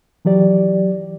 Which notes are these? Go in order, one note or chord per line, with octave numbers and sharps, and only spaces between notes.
E3 F#3 G4 D5